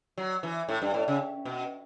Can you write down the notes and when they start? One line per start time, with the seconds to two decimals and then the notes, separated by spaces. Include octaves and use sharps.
0.18 F#3
0.43 E3
0.69 A2
0.82 G2
0.94 A2
1.08 C#3
1.45 B2